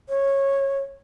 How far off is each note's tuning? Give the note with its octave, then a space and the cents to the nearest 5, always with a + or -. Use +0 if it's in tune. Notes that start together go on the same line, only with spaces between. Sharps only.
C#5 -15